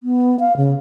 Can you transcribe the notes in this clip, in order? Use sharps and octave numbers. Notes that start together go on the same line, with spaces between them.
B3
F5
C#3